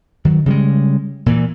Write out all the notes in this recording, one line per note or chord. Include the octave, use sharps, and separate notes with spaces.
D#3 F#3
C#3 G3 G#3
A#2 E3